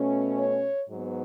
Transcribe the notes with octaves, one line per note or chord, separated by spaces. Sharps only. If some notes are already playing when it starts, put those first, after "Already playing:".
Already playing: B2 A3 C#4
C#5
G#2 F#3 B3